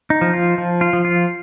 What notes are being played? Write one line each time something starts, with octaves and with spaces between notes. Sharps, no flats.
D#4
F3
F4
F3
F4
F3
F4